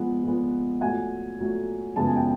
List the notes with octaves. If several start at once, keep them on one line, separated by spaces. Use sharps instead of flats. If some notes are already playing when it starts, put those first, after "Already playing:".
Already playing: A#2 F3 G#3 B3 F#5
A#2 F3 G#3 B3
A#2 F#3 A3 F#5 G#5
A#2 F#3 A3
F#2 C#3 F3 G#3 B3 A5
G#5
G5 A5